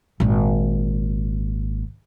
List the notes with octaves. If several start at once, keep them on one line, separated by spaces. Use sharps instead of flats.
G#1 A#2